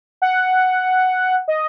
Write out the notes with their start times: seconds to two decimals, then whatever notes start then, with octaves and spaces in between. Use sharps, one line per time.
0.22 F#5
1.48 D#5